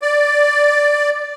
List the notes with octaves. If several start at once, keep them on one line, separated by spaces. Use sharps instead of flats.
D5